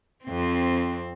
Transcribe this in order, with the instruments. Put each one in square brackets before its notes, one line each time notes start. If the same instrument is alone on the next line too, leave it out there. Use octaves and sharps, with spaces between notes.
[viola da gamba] F2 C4